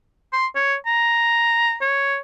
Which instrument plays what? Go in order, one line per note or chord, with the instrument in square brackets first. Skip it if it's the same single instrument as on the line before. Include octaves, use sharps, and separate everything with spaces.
[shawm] C6
C#5
A#5
C#5